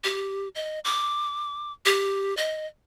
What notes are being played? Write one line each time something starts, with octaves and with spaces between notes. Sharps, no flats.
G4
D#5
D6
G4
D#5